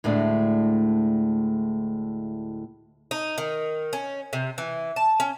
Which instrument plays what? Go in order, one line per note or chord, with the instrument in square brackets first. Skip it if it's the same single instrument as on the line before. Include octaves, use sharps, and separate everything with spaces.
[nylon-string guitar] D2 A2 G#3 A3 D4
[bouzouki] D#4
D#3
C#4
C3
E3
A5
C#4